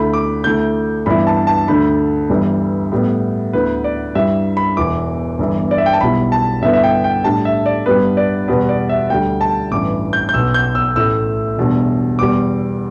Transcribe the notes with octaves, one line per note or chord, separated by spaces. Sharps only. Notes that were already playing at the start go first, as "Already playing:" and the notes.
Already playing: D2 D3 A3 E4 B5
D6
D2 D3 A3 E4 G6
G2 E3 B3 E4 B5
A5
A5
D2 D3 A3 D4 B5
G1 G2 E3 G3
A2 G3 B3
D2 D3 B3 E4 B4
D5
G2 G3 E4 E5
B5
E1 E2 E3 D6
G1 G2 E3
D5
E5
G5
A5
B1 B2 G3 E4 B5
A5
G2 D3 B3 E4 E5
E5
G5
G5
A2 G3 D4 A5
E5
D5
G2 G3 B3 B4
D5
E2 B2 G3 B3 B4
D5
E5
D2 D3 G3 G5
A5
A1 G2 E3 D6
G6
G6
B1 B2 B3 E6
G6
E6
A1 A2 A3 E4 E6
E1 E2 B2 G3 D4
E2 B2 G3 D6